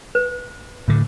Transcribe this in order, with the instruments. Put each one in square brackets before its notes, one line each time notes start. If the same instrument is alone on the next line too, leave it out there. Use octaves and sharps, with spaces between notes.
[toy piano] B4
[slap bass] A2 D3